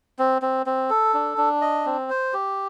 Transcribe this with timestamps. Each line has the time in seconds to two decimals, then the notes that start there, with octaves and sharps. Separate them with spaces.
0.19 C4
0.42 C4
0.66 C4
0.90 A4
1.14 D4
1.38 D4
1.61 D#5
1.86 C4
2.10 C5
2.33 G4